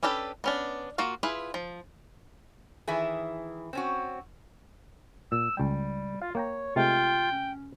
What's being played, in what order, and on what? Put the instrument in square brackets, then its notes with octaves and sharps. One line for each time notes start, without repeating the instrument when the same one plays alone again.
[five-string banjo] C#4 D4 G4 A4 B4
B3 C#4 D4
A#3 F4 F#4 F5
E4 F4 G#4 B4
F3
[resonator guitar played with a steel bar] D#3 E3 E4 G#4
C4 C#4 F#4
[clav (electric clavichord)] A#2 [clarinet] E6
[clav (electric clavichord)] C#2 G5 [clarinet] G3
[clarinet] F4 [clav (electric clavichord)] F5
[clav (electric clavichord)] A#3 G5 A#5 [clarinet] C#5
[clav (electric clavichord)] C3 G#3 A3 [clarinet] F4 [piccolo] G5
[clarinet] C#4